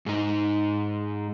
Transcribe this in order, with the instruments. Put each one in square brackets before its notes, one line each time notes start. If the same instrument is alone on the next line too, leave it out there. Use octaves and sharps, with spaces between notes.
[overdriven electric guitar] G#2 D#4